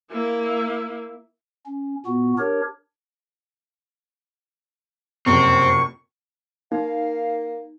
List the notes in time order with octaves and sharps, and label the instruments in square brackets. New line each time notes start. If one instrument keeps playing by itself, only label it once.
[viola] A#3 E4
[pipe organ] C#4
A#2 B3 F#4
D4 G4 A#4 C#5
[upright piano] F#1 F2 C3 [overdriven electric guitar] C4 [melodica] C#6
[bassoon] A#3 [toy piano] D#4 [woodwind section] F5